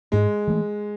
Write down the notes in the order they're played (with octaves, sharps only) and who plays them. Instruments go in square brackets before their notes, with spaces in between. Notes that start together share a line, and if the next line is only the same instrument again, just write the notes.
[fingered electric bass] G#2 [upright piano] G#3
[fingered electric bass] E3 A3